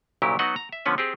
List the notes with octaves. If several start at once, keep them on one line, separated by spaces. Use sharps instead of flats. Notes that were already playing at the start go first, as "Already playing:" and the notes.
C2 A#2 C#3 F#3 E4 G4
F#3 B3 D#4 F#4 D#5 F#5
A#5
E5
D3 F3 B3 C#4 B4
C4 G4 G#4